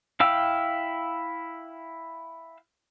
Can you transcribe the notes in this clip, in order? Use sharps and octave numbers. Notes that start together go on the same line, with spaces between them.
E4 F5 G5 E6